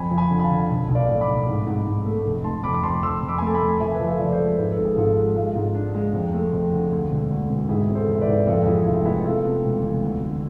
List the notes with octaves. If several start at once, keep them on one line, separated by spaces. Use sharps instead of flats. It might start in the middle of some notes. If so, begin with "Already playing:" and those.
Already playing: F2 G#5 B5
F3
G#5 B5
D3
B5
F5 A5
D3
B1
B1
D5 F5
A2
B5 D6
B1
G#2
G#2
G#2
A3
F1
F1 A5 C6
F2 B5 D6
D6
F2 A5 C6
F2 C6 E6
F2
B5 D6
G#5
A3
A5
G#5 B5
F2
F3 E5 G#5
F3 B4
F4 A4
F3 D5
A4 C5
G#3
G#2 B4
A4
G#1
G#4
G#2 F4 A4
G#3
G#3 F4
G#2
D4
G#3
F2
A3
F2
D3
D2
E1
D2
E1
G#2 E4 G#4
C4
A4 C5
E3
E5
B4 D5
G#2
F2 F4 A4
E3 E4 G#4
F1 F4
B3 E4 G#4
C3 F4 A4
C3
E1
E3
D2
D3